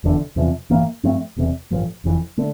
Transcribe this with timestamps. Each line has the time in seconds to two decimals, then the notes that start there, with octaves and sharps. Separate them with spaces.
0.04 F1 E2 D3
0.36 E2 C3 F3
0.70 A1 G2 E3 A#3
1.03 G2 F3 A3 C4
1.37 E1 E2 C3
1.71 A1 G2 F3
2.04 F1 F2 E3
2.38 D3 A3